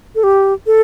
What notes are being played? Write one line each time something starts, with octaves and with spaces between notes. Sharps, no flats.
A4
G4
A4